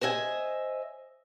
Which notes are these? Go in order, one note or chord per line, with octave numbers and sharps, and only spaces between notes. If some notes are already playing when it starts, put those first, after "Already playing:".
C5 D#5 E5 F#5 G#5